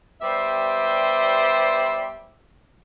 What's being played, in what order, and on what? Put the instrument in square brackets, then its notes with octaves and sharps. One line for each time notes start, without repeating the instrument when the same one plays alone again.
[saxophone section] G3 B3 G4 C5 D5 E5